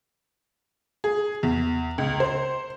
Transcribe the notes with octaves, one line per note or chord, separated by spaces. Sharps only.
G#4
E2
C#2
C5